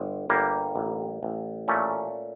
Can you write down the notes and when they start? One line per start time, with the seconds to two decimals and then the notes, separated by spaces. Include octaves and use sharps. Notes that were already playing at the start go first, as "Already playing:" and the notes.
Already playing: G1
0.30 G1 G3 A#3
0.76 A1
1.23 A1
1.68 A#2 A3 C#4